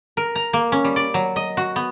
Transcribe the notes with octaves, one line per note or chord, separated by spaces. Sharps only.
A#4
A#5
A#3
C#4
G3
D5
F#3
D#5
F#4
B3